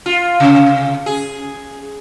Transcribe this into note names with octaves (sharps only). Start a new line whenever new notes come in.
F4
C3
G#4